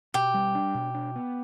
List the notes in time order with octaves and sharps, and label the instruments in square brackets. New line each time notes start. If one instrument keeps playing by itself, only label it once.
[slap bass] B2 [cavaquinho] G4
[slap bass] G3
D4
B2
D4
B3